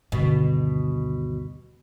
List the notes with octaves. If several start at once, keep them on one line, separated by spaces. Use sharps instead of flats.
D2 G2 B2 D3 D#3